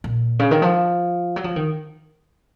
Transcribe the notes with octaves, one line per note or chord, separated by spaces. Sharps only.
A#2
C#3
D#3
F3
F#3
F3
D#3